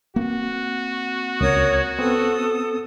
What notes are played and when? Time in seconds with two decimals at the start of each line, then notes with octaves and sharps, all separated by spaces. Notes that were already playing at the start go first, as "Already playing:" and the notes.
0.16 A#3 C4 F#4
1.41 C#2 A#4 C#5 D#6
1.99 B3 C4 A4 D#6